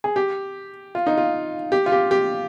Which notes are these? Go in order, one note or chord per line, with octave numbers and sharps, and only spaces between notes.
G#4
G4
F4
D#4
F4
G4
F4
G4
G4